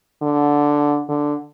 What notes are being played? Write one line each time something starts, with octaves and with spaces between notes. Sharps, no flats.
D3
D3